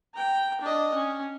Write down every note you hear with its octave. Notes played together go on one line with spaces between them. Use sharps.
G5 A#5
D4 D#5
C#4